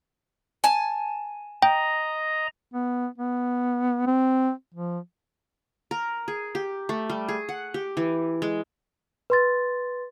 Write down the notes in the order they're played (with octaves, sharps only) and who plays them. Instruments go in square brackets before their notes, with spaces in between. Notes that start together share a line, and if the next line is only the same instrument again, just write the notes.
[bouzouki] G#5 A5
[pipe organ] D#5 A#5 [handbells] G5
[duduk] B3
B3
C4
F3
[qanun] A#4
G#4
G4
A3
G3
G#4
F#5
G4
E3
G#3
[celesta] B4 C6 A6